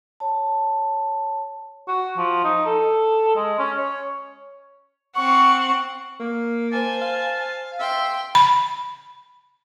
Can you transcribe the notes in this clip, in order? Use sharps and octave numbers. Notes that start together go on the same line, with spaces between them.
C#5 A5
F#4
F3
D#4
A4
G#3
C#4
C#5
C4 F#5 C#6
A#3
C5 G#5 A5
F5
E5 G5 C6
B5